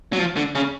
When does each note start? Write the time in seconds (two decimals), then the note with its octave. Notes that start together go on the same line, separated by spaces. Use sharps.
0.13 F#3
0.19 F3
0.36 D3
0.55 C#3